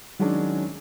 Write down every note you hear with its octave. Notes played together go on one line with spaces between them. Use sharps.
D#3 F#3 G#3 C#4 D4